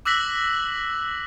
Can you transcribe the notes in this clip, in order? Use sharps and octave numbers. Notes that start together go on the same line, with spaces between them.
D6 E6 F#6 A#6 B6 F#7